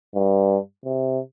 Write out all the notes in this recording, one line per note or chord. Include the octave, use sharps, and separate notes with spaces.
G2
C3